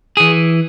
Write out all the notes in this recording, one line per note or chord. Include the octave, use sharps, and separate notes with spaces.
E3 G#4